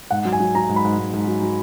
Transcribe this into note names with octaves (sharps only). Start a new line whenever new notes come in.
G#2 F#5
F#3
G#5
F#3
F#3 A#5
G#2
B5
G#2
G#2
G#2
F#3
F#3